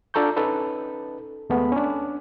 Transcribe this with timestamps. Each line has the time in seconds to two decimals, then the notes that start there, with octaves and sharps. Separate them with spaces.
0.14 D4 F4 A4 A#5 C#6 G6
0.37 C#4 D#4 A4 B4
1.49 D#2 G#3 A3 B3 B5
1.72 C#4 D4